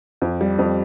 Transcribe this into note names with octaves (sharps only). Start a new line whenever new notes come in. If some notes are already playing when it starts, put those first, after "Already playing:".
F2
G3
F2